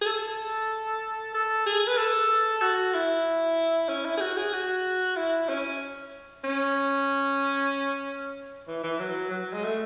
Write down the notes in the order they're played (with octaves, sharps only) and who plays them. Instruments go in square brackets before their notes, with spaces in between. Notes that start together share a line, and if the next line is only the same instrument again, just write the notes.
[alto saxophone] G#4
A4
A4
G#4
B4
A4
F#4
E4
C#4
E4
G#4
F#4
G#4
F#4
E4
C#4
C#4
E3
E3
F#3
F#3
G#3
A3